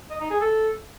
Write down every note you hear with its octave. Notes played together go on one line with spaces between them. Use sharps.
D#5
D#4
G#4
A4